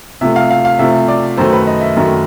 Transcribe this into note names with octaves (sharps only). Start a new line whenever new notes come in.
C3 F3 A3 E5
F5
F5
F5
C3 F3 A3 E5
D5
F#2 D#3 F#3 A3 C5
B4
D#5
E5
F#2 D#3 F#3 A3